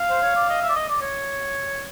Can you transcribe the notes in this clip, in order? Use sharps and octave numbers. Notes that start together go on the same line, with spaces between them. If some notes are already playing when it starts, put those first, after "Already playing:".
Already playing: F5
C5
C#5
D5
D#5
E5
D5
D#5
D5
C#5